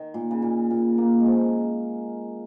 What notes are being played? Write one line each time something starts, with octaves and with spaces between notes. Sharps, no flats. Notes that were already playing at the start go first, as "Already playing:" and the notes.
Already playing: D#3
A#2
C#3
A#2
A#2
A#3
G#3
F3